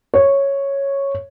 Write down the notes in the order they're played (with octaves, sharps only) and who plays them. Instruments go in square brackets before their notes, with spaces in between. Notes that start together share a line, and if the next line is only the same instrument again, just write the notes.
[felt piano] C#5